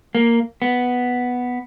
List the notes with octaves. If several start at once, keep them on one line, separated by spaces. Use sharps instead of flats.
A#3
B3